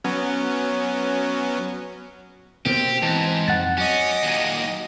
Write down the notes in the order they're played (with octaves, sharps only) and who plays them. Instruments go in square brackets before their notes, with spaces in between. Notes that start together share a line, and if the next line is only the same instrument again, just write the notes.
[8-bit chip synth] F#3 B3 C#4
[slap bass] B2 A#3 [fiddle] C4 [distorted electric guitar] G4
[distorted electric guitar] G#2 [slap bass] E3 [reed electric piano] A5
[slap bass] F2 [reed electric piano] F#5 A6
[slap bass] F#3 [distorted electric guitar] C#4 [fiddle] D#5 D6
[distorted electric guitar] D#2 A#2